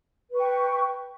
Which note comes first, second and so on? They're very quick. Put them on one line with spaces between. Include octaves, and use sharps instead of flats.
B4 C#6 G5